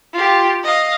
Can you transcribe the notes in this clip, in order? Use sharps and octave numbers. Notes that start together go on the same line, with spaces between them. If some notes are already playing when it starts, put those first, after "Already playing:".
F4 G4
D#5 F5